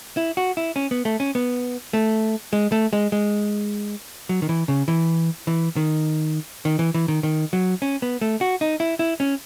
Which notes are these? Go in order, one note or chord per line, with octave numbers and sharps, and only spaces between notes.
E4
F#4
E4
C#4
B3
A3
C#4
B3
A3
G#3
A3
G#3
G#3
F#3
D#3
E3
C#3
E3
E3
D#3
D#3
E3
E3
D#3
D#3
F#3
C#4
B3
A3
F#4
D#4
E4
E4
C#4